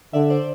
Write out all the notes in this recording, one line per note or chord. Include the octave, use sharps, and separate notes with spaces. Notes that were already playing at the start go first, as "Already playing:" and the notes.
D3 D5 E5
C5 D5